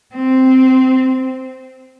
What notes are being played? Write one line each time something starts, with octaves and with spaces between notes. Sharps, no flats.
C4